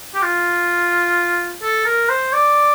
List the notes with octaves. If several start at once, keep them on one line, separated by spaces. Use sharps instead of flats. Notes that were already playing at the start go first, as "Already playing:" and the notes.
G4
F4
A4
A#4
C5
D5